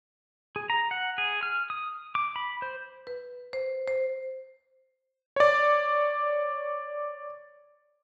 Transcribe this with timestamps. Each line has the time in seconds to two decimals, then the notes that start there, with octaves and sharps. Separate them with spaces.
0.56 G#4
0.70 A#5
0.91 F#5
1.18 G#4
1.43 F6
1.70 D#6
2.15 D6
2.36 B5
2.62 C5
3.07 B4
3.53 C5
3.88 C5
5.36 C#5 D5